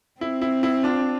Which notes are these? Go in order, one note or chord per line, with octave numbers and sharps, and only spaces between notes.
C4 E4
E4
E4
D4 F4